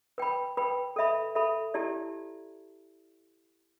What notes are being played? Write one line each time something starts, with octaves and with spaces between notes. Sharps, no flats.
B4 G5 B5
B4 G5 B5
A4 E5 B5
A4 E5 B5
E4 G4 D5 A5